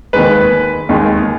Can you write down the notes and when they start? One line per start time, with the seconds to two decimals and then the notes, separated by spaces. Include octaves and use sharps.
0.13 D#2 D#3 G#3 B4
0.89 D#2 D#3 G#3